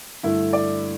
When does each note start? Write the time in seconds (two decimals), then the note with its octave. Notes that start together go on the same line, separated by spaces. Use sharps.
0.23 G2 D3 A3 E4
0.53 D5